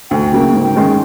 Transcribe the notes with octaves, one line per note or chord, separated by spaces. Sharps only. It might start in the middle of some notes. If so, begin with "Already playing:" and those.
D2 G5
C#3 F#3 A#3
G#2
D#3 G#3 C#4